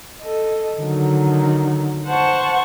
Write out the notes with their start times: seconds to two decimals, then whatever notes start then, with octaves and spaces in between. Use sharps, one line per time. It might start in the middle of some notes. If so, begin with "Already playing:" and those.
0.20 A4 D#5
0.80 D3 D#3 F#3
2.06 C5 F#5 A5 C#6